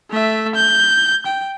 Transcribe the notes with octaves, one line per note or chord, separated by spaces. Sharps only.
A3 E5
G6
G5